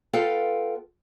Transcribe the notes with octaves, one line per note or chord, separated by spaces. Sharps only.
B3 F4 A4 B4 F5 G5